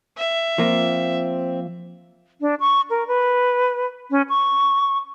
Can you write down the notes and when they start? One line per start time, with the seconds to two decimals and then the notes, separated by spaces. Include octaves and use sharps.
0.17 E5
0.58 F3 A#3 C4 F4
2.41 D4
2.60 C#6
2.90 A#4
3.07 B4
4.11 C#4
4.29 C#6